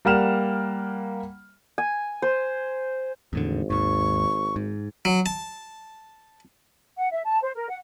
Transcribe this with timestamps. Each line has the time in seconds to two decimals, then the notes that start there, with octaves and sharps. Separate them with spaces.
0.05 G3 A#3 F#5 F6 E7
1.78 G#5
2.22 C5
3.33 G#1 E2 A2 D3
3.70 D#2 G#2 C#6
4.56 G#2
5.05 F#3
5.26 A5
6.97 F#5
7.13 E5
7.25 A5
7.43 C5
7.55 A#4
7.69 F#5